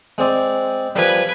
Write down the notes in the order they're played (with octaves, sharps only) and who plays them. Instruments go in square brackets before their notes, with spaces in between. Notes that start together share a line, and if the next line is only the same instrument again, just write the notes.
[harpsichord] G#3 C4 D5
[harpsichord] F3 G3 [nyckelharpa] B4 G#5